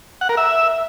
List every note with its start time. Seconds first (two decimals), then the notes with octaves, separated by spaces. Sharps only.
0.21 F#5
0.29 A#4
0.37 E5